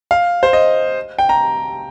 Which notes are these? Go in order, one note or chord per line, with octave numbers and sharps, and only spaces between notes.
F5
C5
D#5
G5
A#5